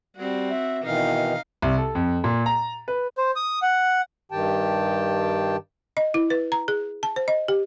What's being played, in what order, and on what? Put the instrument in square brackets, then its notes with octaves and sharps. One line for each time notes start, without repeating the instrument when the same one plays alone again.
[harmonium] G3 [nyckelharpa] C4 F#4
[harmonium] E5
[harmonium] B2 D#3 E3 [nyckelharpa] D#4 F5
[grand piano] C2
A4
F2
A#2
A#5
B4
[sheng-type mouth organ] C5
D#6
F#5
[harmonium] G2 D#3 G4 G5 A5
[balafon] D#5
E4
B4
A#5
G#4
A5
C5
D#5
G4